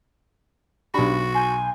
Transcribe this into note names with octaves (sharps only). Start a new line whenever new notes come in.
B1 D4 F#4 G4 B5
G#5 C6 G6